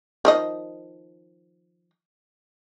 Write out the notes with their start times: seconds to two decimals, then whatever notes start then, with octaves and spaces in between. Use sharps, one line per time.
0.25 D#3 F3 D#5